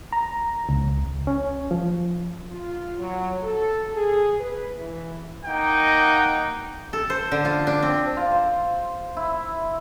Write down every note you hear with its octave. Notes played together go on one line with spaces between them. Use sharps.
A#5
C#2
C#4
F3
F4
F#3
A4
G#4
B4
E3
A#3 D#4 F#5 G5
A4
C5
D3
F4
D4
C4
F4
C5
E4